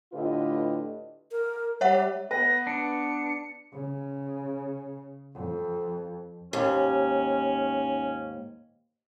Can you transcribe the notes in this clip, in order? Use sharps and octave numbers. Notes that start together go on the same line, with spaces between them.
A2 D3 F4 G4 B4 D#5
A#4
G3 C#5 E5 F#5
B3 B4 A#6
D4 C#7
C#3
F2
D#2 G#2 C#4